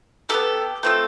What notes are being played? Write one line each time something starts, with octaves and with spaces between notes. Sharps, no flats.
B3 D4 G4 A4
A3 C4 F4 A4